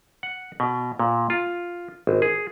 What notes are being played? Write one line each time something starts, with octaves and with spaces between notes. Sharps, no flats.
F#5
B2
A#2
F4
G#1
G#4